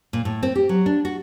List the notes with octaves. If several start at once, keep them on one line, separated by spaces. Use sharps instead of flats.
A#2
A2
C4
G4
F#3
D4
F#4